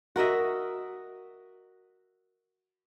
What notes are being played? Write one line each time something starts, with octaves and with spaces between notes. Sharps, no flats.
F#4 A#4 D#5 E5